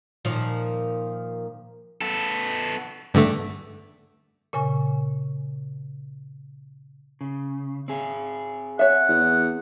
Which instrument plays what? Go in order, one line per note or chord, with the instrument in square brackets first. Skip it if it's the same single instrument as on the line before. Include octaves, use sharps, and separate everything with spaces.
[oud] A#2 D#3 F3
[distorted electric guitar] B3 A4
[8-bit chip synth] G2 D3 A3
[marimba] A#2 C#3 G#5 C#6
[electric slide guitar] C#3
C4 G#4
[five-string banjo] C#5 E5 [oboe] F#5
[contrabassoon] E2